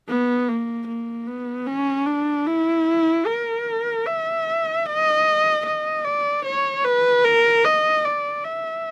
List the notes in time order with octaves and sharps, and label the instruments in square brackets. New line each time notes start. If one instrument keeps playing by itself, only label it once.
[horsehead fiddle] B3
A#3
A#3
B3
C#4
D4
E4
A#4
E5
D#5
D#5
D5
C#5
B4
A#4
D#5
D5
E5